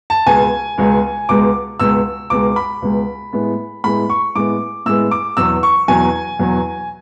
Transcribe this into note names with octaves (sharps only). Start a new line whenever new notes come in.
A5
C#2 B2 G#3 B3 G#5
C#2 B2 G#3 B3
C#2 B2 G#3 D6
C#2 B2 G#3 E6
C#2 B2 G#3 D6
B5
C#2 B2 G#3
A2 G#3 B3
A2 G#3 B3 B5
C#6
A2 G#3 B3 D6
A2 G#3 B3 E6
D6
E2 B2 F#3 E6
C#6
E2 B2 F#3 G#5
E2 B2 F#3